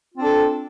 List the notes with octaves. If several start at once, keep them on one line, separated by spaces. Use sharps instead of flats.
C4 D4 F4 A4